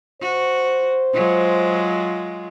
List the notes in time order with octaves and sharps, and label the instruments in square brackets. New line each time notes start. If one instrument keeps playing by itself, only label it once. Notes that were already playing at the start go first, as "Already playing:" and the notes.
[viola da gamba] F#4 [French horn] C5
[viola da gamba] F#3 G#3 F4